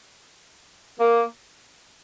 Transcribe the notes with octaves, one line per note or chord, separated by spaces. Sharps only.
A#3